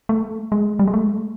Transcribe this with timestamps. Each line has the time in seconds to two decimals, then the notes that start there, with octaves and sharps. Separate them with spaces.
0.09 A3
0.52 G#3
0.79 G3
0.87 G#3
0.94 A3